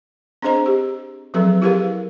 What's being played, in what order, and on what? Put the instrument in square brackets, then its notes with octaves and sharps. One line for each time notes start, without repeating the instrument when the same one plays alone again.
[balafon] C4 D4 G#4 C5 D#5 A#5
G4
F3 F#3 C4 G#4 A4 B4
E4 G4 G#4 A#4 B4 F5